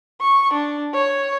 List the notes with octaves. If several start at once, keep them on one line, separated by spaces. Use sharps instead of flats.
C#6
D4
C#5